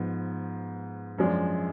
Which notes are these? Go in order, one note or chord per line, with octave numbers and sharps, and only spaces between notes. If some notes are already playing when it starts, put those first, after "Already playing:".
Already playing: G#2 F3 B3
F#2 F3 G#3 D4